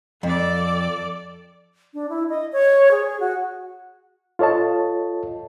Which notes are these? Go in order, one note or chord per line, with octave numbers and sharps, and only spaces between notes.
F2 A4 D5
D4
E4
D#5
C#5
G#4
F#4
F4 A4 C#5 D#5 A5